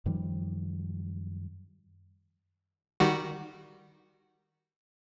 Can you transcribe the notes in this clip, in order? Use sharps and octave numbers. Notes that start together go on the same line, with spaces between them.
F#2 D#3 F3 G3
D#3 G3 F#4